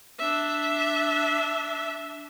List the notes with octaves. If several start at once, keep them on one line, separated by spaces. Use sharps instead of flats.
D4 E5